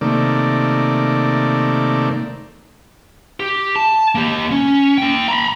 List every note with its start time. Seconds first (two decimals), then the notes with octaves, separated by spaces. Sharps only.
0.01 C3 D#3 A3 A#3 D5
3.40 G4
3.76 A5
4.15 A#3 G4
4.51 C#4
4.98 A#3 G5
5.28 A#5 B5